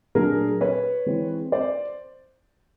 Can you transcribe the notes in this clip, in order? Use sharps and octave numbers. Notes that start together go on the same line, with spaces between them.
A#2 F#3 A3 D4 G#4 A#4
B4 C#5
E3 G#3 C4
C5 D5